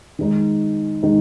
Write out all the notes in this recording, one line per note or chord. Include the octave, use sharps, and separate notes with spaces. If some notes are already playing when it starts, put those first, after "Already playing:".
D#3 G#3 D#4
D#3 G#3 D#4